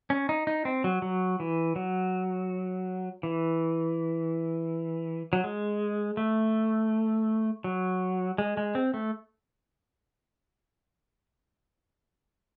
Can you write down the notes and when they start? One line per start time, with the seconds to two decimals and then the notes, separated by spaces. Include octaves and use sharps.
0.10 C#4
0.29 D#4
0.47 D#4
0.65 C4
0.84 F#3
1.02 F#3
1.40 E3
1.76 F#3
3.23 E3
5.33 F#3
5.44 G#3
6.17 A3
7.64 F#3
8.38 G#3
8.57 G#3
8.75 C4
8.94 A3